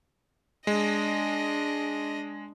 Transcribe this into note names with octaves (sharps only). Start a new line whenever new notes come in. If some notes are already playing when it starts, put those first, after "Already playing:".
G#3 D4 D#5